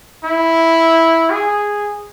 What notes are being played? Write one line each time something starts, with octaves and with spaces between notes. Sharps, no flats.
E4
G#4